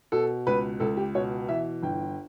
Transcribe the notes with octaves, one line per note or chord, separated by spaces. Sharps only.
B2 A4
C#2 B4
C#2 A4
G4
B2 C#5
E3 E5
G1 G5